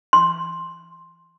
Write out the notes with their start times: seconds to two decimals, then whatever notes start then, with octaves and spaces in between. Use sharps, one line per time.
0.13 C6